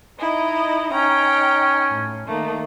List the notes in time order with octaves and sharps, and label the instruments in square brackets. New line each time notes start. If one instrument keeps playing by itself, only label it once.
[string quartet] D#4 E4 D#5
[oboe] C#4 [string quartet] D#4 G5 A#5
[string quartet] A2
D#3 A3 A#3